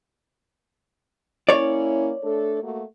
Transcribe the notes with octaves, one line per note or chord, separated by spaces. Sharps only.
A#3 C#4 E4 C#5 D5
A3 D4 A4
A3 A#3 F#4